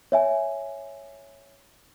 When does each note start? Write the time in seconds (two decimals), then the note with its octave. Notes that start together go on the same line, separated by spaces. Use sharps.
0.12 C#5 E5 G#5